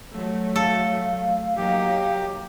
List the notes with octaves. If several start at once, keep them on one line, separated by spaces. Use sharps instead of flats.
F#3 A3
A4 F5
F#3 A#3 D#4 G4